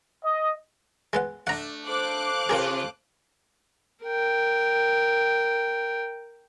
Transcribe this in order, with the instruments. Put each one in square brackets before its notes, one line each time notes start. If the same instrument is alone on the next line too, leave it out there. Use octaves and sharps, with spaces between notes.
[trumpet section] D#5
[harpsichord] G#3 B3 F#5
[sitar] A3 D4 [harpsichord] F#5 A#5
[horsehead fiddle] A4 C5 [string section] F5 D6 F#6
[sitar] C3 F4 [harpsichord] G#4 A#4 G5
[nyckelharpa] A#4 G5